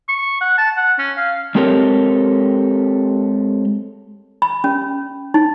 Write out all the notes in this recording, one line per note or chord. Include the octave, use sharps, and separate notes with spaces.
C#6
F#5
A5
F#5
C#4
F5
G#3 C4 G4 A4 A#4 C#5
B5
C#4
D#4